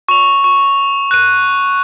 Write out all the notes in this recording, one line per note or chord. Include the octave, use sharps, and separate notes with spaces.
C#6 F7
C#6
F#6 D#7